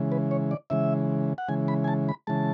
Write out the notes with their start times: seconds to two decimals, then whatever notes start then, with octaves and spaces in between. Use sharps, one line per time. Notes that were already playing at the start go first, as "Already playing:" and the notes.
Already playing: C#3 E3 G#3
0.12 B4
0.31 C#5
0.51 D5
0.70 C#3 E3 G#3 E5
1.38 F#5
1.48 C#3 E3 G#3 G#5
1.68 B5
1.84 G#5
1.88 A5
2.09 B5
2.27 C#3 E3 G#3 A5